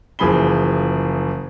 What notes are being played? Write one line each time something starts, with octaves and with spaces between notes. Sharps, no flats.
F#1 E3 F3 G#4 B5 G7